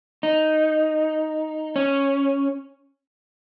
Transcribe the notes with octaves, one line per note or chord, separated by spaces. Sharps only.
D#4
C#4